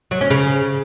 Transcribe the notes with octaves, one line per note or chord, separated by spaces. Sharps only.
F#3
C#4
C#3